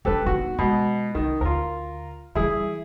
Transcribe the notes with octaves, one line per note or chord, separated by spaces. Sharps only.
G3 D4 G4 A4 B4
B3 D#4 F#4
B2 G#3
C2 D#3
D2 F4 A#4
E3 G3 E4 G#4